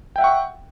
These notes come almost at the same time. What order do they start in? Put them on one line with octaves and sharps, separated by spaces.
G5 E5 F#5 C#6